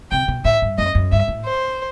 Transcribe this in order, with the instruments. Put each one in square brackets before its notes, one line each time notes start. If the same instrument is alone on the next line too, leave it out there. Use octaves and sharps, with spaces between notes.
[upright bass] C3 [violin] G5
[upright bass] B2
[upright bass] A2 [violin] E5
[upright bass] G2
[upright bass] F#2 [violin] D#5
[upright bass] F#2
[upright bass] G2 [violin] E5
[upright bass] A2
[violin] C5